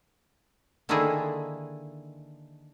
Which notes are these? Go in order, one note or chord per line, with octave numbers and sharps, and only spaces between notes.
D3 D#3 A#3 D4 E4 G#4